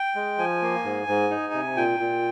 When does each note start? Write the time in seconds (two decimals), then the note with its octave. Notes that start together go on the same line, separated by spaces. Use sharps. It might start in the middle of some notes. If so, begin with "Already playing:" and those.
Already playing: G5
0.15 G#3
0.38 F3 G#5
0.62 A#3
0.84 G#2
1.08 G#2
1.30 D#4
1.53 C3
1.76 A#2 G5
2.00 A#2